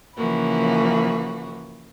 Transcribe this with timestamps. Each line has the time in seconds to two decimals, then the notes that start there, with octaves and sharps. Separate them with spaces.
0.16 C#3 E3 F3 A#3 F#4 B4